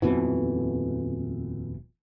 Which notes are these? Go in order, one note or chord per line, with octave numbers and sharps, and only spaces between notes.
D#1 F2 B2 E3